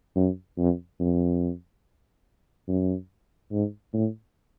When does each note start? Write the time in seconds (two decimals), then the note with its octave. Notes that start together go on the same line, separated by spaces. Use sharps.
0.16 F#2
0.58 F2
1.00 F2
2.68 F#2
3.52 G#2
3.94 A2